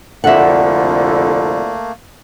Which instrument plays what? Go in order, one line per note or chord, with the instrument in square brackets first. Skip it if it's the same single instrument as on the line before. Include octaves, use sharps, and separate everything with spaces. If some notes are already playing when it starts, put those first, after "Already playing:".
[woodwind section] C2 F2 D3 [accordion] A3 A#3 [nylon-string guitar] E5 F#5